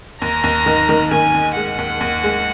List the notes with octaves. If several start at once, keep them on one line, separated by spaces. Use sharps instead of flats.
D#2 A#5
D#2
D#3
D#3
D#3 G#5
D#2
G#3 F#5
D#2
D#2
G#3